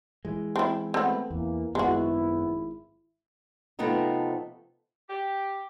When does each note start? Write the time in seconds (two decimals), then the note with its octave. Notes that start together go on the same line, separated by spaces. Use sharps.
0.25 E3 G#3
0.56 C4 E4
0.94 A3 B3 C4 B4 F#5
1.30 E2 E3 A#3
1.75 G#1 F#2 G#3 B3 E4 F#4
3.79 C3 F3 A3 B3 C4 D#4
5.09 G4